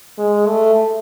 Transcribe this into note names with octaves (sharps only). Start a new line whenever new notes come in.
G#3
A3